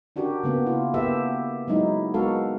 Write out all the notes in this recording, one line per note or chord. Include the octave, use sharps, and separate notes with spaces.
C#4 D4 F#4 G4 A#4
C#3 A#3 B3
E4 F4
A#3 B3 G4 A4 E5
F#3 G#3 D#4 E4
G#3 B3 F#4 A4 A#4 F5